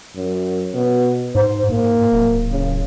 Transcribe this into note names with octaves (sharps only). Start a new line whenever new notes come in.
F#2
B2
G#2 C5
G#2 A#3
D1
C#3